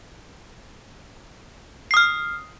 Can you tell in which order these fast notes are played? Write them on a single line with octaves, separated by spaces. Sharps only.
C7 D#6 F6